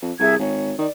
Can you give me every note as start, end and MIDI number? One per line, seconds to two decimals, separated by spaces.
0.02 0.12 41
0.19 0.35 36
0.19 0.35 68
0.19 0.35 76
0.19 0.35 92
0.39 0.74 32
0.39 0.78 73
0.79 0.87 51
0.79 0.89 74